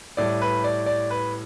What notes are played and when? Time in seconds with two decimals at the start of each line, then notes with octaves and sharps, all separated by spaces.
0.17 A2 G3 D5
0.41 B4
0.64 D5
0.86 D5
1.10 B4